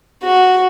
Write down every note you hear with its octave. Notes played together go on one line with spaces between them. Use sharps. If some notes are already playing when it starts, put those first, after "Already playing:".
F#4